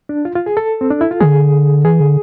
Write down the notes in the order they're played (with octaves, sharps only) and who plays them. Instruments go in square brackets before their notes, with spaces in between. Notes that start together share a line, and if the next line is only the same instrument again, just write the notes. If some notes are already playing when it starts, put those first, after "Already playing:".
[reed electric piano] D4
F4
F4
G#4
A4
C4
D4
E4
F4
[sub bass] D3 [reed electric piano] G#4
[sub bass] E3 [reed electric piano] G#4
[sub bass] D3